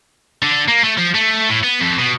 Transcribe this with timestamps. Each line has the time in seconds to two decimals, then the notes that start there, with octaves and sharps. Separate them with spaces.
0.43 D3
0.68 A#3
0.84 A3
0.98 F3
1.14 A3
1.49 A2
1.63 B3
1.81 F2
1.98 B2